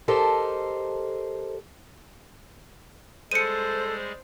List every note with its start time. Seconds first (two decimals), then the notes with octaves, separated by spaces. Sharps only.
0.08 G4 A4 A#4 C5 D#5 A5
3.31 G3 G#3 G#4 A4 C5 C#7 D#7